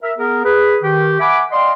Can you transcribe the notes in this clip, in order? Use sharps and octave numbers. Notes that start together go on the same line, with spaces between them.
A#4 E5
B3 G#4 A#4
G#4 B4
D#3 G4
E5 F#5 G#5 B5 D6
D5 D#5 F5 G5 C6